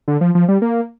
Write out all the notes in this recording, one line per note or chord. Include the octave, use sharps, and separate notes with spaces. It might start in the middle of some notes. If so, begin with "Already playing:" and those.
D3
F3
F3
G3
A#3